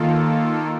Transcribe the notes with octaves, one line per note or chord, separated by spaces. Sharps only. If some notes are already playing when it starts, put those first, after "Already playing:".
Already playing: D#3 A#3 F4 A4